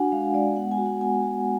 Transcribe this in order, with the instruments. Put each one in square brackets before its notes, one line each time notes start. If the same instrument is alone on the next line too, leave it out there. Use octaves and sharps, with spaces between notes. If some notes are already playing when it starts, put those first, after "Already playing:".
Already playing: [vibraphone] D4 F#4 F#5 G#5
G#3 F5
G#3 D5
B3 F#5
G#5
F#4
F#5
B3 G#5
F#4